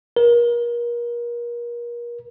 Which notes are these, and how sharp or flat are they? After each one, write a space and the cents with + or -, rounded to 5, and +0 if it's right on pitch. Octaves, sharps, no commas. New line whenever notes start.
A#4 +35